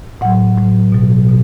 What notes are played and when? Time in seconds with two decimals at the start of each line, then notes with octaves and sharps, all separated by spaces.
0.21 A2 F#3 F#5
0.57 A2 F#3
0.92 B2 F#3
1.28 B2